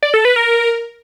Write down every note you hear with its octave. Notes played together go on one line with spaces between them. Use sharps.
D5
A4
B4
A#4